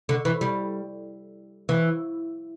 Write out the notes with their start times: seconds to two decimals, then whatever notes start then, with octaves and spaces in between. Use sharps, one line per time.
0.09 D3
0.25 E3
0.41 G3
1.69 E3